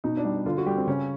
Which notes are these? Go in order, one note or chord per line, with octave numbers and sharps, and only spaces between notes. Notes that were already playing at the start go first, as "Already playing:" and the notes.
B2 D#4
D4
G3
D3 F4
F#4
G3 G4
C4
C#3 C#4